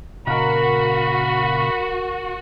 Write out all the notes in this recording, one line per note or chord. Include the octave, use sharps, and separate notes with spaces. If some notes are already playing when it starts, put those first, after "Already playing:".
A#2 C#3 F#4 A#4 F5 F#5 B5